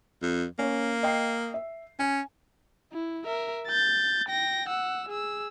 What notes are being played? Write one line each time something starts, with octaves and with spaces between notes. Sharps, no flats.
F2
A#3 C#4
D#5 G5 C7
E5
C#4 G#5
E4
A#4 E5
G6 A6
G5 A#6
F#5 E6
G#4 E6